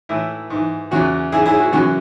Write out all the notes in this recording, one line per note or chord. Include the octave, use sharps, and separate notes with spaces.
A2 E3 E4
G#2 E3
E2 C#3 E3 F#4
G#2 E3 E4 G#4
E4 G#4
F#4
F#2 C#3 E3 F#4